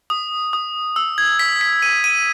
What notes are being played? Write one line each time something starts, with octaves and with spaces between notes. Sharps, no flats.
D#6
D#6
E6
G#6
B6
B6
D#7
D#7